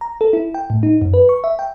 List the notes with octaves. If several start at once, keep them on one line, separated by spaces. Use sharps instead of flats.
A#5
A4
E4
G5
A2
D#4
F#2
B4
C#6
E5
G5